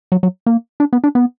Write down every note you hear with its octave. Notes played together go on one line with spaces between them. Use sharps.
F#3
F#3
A#3
D4
B3
D4
B3